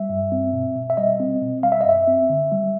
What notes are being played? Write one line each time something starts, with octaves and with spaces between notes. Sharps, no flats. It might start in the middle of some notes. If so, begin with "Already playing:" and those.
Already playing: G3 E5
G2
C4
B2
B2
E5
G3 D#5
C4
B2
G3 F5
E5
D#5
F#2 E5
C4
D3
G3